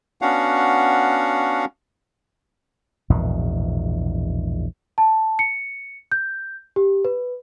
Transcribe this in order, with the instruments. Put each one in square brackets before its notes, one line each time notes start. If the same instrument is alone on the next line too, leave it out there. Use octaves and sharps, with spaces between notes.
[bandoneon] B3 C#4 D4 F#4 F5 F#5
[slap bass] A#1 E2 G#2 B2
[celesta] A5
C#7
G6
G4
B4